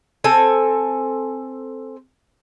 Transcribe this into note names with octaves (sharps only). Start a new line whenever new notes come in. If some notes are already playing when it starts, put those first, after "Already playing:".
C4 A4 G#5